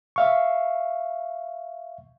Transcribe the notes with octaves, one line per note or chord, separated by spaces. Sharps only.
E5 F5 C#6